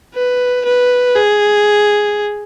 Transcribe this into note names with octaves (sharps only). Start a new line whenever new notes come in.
B4
B4
G#4